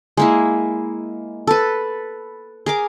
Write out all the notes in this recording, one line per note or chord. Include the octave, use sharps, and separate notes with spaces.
G#3 A#3 E4
A4 B4
G#4 A#4 D6